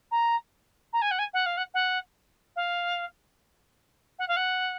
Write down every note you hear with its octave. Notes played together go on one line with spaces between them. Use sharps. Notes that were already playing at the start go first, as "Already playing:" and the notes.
A#5
A#5
G#5
F#5
G#5
F#5
F5
F#5
F#5
F5
F#5
F5
F#5